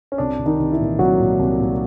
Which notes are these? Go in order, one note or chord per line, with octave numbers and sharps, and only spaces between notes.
C#4
C2 D4
C2
D#3 D#4
C2
E3 E4
A#2
C2 F#3 F#4
A#2
C2
A#2